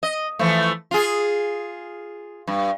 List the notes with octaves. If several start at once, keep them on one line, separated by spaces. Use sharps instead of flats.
D#5
E3 F3 A3
F4 G#4
G2